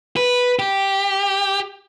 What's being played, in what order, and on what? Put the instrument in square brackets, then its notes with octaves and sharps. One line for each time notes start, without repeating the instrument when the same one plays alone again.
[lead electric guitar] B4
G4